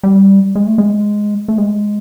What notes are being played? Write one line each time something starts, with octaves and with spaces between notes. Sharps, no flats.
G3
G#3
A3
G#3
A3
G#3